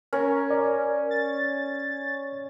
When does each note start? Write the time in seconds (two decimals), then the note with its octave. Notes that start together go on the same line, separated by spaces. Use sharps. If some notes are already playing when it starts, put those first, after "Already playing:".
0.13 C#4 A#4
0.51 D5
1.11 A6